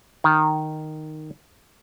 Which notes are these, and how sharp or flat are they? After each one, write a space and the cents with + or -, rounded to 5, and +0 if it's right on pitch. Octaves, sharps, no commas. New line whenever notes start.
D#3 -5